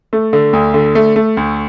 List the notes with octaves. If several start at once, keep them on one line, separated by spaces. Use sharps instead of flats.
A3
D3
D2
D3
A3
A3
D2